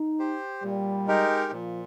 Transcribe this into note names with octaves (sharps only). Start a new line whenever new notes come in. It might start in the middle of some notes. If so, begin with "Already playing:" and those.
Already playing: D#4
G4 C5
A#2 G3
G#3 D#4 G4 A#4
A#2 F3